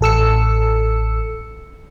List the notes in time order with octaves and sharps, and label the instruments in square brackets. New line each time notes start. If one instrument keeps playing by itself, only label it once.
[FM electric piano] A1 A4 E6 C#7